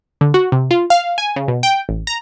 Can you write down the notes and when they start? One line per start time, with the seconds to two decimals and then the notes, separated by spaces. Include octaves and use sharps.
0.21 D3
0.34 F#4
0.52 C3
0.71 F4
0.90 F5
1.18 G#5
1.36 C#3
1.48 B2
1.63 G5
1.89 A1
2.07 A#5